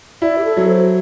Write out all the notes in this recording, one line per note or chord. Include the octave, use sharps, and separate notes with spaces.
E4 D5
G4
A4
F#3
C5